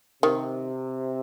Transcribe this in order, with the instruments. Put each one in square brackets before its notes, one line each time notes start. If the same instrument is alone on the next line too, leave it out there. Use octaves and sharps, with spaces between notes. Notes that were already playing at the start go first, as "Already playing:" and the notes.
[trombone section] C3 [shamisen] D#3